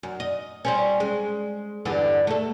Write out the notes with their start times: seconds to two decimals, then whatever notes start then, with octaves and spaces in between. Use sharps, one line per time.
0.03 F#2
0.20 D#5
0.65 G3 C4 C#4
1.00 G#3
1.85 E2 G2 D3
2.27 A3 A4